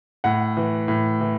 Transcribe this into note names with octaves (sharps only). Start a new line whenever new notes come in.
A2 F#5
E3
A2
E3